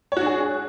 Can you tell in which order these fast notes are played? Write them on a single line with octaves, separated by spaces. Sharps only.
C#5 F#4 D4 G#4